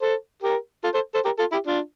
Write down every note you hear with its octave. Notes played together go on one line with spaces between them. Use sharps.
A4 C5
G4 A#4
F4 A4
A4 C5
A4 C5
G4 A#4
F4 A4
E4 G4
D4 F4